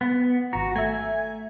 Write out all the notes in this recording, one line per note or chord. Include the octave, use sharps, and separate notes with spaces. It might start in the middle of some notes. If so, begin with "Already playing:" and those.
B3
G#1 F#4 A#5
A3 E5 G#5